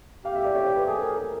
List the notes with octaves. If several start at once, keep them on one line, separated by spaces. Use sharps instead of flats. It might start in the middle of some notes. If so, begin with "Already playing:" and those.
G4 F5
E5
D5
C#5
C5
B4
G#4 A4
A#4
A#4